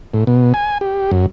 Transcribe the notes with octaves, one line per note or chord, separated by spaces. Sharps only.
A2
B2
G#5
G4
F#2